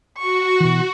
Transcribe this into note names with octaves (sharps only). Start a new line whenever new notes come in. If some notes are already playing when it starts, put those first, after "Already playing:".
F#4 C#6
B2 E3